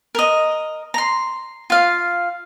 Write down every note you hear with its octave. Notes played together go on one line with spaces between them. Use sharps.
A#4 D#5
A#5 C6
F4 F5